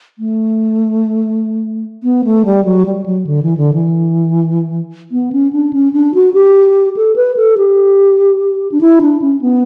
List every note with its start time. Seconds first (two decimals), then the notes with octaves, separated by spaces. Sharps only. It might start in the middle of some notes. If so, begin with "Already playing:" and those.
0.19 A3
2.03 B3
2.24 A3
2.45 G3
2.65 F#3
2.86 G3
3.06 F#3
3.27 D3
3.43 E3
3.57 D3
3.74 E3
5.12 B3
5.33 C#4
5.53 D4
5.73 C#4
5.93 D4
6.14 F#4
6.34 G4
6.97 A4
7.16 B4
7.37 A4
7.58 G4
8.72 D4
8.81 E4
9.02 D4
9.22 C#4
9.41 B3